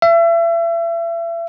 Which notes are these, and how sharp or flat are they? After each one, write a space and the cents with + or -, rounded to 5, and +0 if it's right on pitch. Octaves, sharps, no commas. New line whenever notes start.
E5 +35